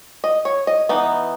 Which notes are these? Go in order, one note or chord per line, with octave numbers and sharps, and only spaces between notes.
D#5
C#5
D#5
E3 B3 D#4